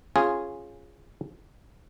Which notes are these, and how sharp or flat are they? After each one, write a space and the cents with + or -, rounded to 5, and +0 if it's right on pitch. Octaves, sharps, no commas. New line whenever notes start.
C#4 -15 F4 +0 G#4 +0